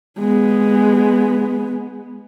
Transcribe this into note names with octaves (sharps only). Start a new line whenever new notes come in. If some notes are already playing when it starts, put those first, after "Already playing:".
G#3 B3